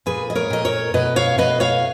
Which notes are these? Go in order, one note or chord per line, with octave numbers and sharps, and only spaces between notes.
A#2 G#4 B4
D#5
A#4 C#5
A#2 D#5
A#4 C#5
B2 B4 D#5
C#5 F5
B2 B4 D#5
C#5 F5